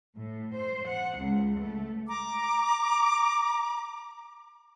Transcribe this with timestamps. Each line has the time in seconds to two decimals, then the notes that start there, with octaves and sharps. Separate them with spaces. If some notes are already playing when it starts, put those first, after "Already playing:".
0.17 A2
0.53 C5
0.87 F#5
1.17 C#2
1.60 A3
2.07 A#5 D6